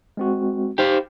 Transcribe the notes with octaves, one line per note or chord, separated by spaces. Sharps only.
G#3 C4 F#4
D#4 G4 C5 F5